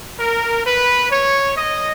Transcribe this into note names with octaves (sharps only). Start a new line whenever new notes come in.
A#4
B4
C#5
D#5